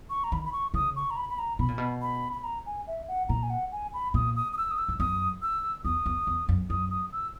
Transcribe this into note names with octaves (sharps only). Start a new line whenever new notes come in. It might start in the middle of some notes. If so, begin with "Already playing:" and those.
C#6
A#5
D#3 B5
B5
C#6
C#3 D#6
C#6
A#5
B5
B5
A#5
B2 B5
A#2
B2
B5
B5
A#5
G#5
E5
F#5
A#2 A#5
G#5
F#5
G#5
B5
A#2 D#6
D#6
D#6
E6
D#6
E6
G#2
F#2 D#6
E6
E2 D#6
E2
E2
F#2
F#2 D#6
D#6
E6